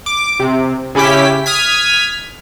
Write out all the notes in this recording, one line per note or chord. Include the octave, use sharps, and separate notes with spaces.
D6
C3
C#3 C#4 E4 G4 B6
D#6 F6 G#6 B6